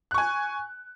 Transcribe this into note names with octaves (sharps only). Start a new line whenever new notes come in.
G#5 C#6 F#6